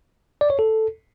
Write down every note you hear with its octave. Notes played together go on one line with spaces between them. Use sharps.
D5
C#5
A4